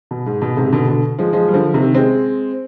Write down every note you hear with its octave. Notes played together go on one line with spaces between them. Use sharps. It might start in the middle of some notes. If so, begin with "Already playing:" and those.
B2
G#2
B2
G#2 C3
B2 D3
B2 D3
F3 G#3
F3 G#3
G3
D3 F3
C3 D#3
G#3 C4